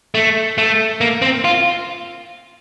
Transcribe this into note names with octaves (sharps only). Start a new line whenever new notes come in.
A3
A3
A#3
C4
F4